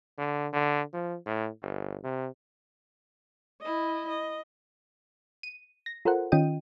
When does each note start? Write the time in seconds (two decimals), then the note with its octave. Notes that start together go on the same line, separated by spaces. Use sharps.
0.18 D3
0.53 D3
0.93 F3
1.26 A2
1.62 G1
2.04 C3
3.61 E4 D#5
4.08 D#5
5.43 D#7
5.86 A#6
6.05 F4 A4 A#4 C5 F#5
6.32 D#3 C#4 F4 D#5 G5 D#7